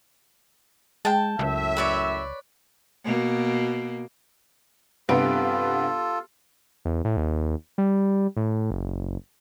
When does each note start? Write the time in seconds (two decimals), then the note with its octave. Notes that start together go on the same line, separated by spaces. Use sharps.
1.05 G#3 G5 A5
1.39 C#2 F#2 A2 E5
1.77 B4 C#5 D5
3.05 B2 A#3
5.09 G2 C3 B3 F4 A4 D7
6.85 E2
7.05 A2
7.17 D#2
7.78 G3
8.37 A2
8.71 F#1